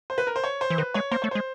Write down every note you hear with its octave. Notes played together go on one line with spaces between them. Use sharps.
C5
B4
A#4
C5
C#5
C5
E3
D#3 B4
G#3 C#5
A#3 C5
A3 C#5
G#3 C5